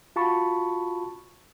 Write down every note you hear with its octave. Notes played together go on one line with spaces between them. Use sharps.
F4 F#4 A5 B5 C#6